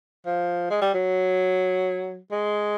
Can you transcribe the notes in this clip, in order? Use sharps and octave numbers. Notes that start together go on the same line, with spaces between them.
F3
G#3
G3
F#3
G#3